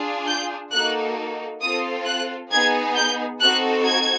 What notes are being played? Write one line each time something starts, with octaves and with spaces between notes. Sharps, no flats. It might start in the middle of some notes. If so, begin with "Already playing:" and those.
Already playing: D4 F4 G#4
G6
A#3 D#4 F#4 A4 F#6
C4 F4 A4 D#6
F#6
B3 D#4 G#4 G#6
G6
C4 D#4 F#4 A4 F#6
G#6